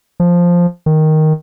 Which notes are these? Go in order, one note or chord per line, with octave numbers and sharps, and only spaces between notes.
F3
D#3